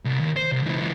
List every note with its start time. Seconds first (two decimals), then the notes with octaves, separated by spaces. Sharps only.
0.05 C2
0.20 D#2
0.36 C5
0.52 C2
0.63 C#2 E3